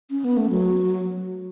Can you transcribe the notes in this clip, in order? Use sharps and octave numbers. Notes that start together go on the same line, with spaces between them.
C#4
B3
A3
F#3